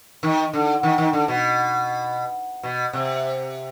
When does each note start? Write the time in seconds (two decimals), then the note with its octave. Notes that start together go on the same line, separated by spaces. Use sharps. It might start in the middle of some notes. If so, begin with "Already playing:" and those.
0.23 D#3
0.53 D3
0.83 D#3
0.98 D#3
1.13 D3
1.28 B2
2.63 B2
2.93 C3